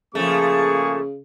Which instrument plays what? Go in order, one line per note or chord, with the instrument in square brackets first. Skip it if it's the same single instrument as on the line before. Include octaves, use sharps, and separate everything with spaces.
[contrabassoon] C#3 [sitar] F3 A3 [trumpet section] A#3 G#4 C#6